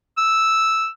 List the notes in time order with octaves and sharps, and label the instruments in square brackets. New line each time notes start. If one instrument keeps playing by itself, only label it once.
[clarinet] E6